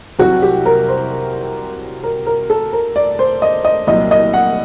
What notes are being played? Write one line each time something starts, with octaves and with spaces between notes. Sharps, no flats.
C2 C3 F#3 F#4
G4
A#4
C5
A#4
A#4
A4
A#4
D5
C5
D#5
D#5
C2 A#2 F#3 D#5
D#5
F#5